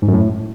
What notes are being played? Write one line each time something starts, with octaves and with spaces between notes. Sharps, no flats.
G#2
F#2
A2